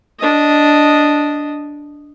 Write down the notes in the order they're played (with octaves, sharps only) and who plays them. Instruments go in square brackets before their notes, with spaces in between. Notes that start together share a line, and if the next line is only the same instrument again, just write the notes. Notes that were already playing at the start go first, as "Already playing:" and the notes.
[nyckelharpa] D4 D#5